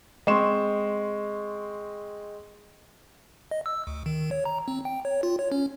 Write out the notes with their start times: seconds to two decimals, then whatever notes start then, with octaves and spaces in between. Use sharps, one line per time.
0.27 G#3 C4 C6 C#6 E7
3.51 D#5
3.66 E6
3.87 D2
4.06 D#3
4.31 C#5
4.45 A#5
4.68 C4
4.85 G5
5.05 C#5
5.23 F4
5.39 C#5
5.52 C#4